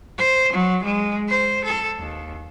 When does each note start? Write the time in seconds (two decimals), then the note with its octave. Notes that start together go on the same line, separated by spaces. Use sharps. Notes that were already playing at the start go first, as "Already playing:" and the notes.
0.18 C5
0.53 F#3
0.84 G#3
1.28 C5
1.65 A4
1.98 D#2